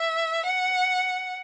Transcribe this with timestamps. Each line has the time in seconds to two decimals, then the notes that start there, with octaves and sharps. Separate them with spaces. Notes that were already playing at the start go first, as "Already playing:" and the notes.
Already playing: E5
0.45 F#5